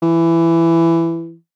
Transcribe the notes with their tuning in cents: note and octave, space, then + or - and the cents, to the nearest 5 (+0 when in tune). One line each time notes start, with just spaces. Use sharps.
E3 +15